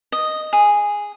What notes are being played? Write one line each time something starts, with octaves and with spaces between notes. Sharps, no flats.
D#5
G#4